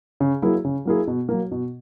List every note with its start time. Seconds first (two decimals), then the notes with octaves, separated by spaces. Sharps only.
0.20 C#3
0.42 F#3 A#3 E4 G#4
0.65 C#3
0.85 F#3 A#3 E4 G#4
1.07 B2
1.29 F#3 A#3
1.51 B2